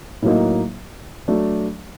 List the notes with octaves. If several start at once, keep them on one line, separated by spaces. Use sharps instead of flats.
A2 F#3 A#3 D#4
F#3 A3 D4